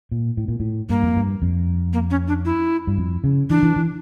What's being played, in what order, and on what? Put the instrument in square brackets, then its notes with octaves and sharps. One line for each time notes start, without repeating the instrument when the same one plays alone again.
[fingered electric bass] A#2
A2
A#2
A2
[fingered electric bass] G2 [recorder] A#3
[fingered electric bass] F2
G2
F2
[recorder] A#3
C#4
D4
E4
[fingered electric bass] G2
F2
C#3
[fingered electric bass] E3 [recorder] D4
[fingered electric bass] E3
E3